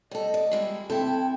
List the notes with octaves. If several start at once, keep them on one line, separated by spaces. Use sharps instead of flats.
G3 A4 D#5
D5
G3 G#3 E4
C4 E4 A4 G5